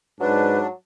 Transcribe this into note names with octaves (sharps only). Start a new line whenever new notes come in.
G#2 F#3 D4 B4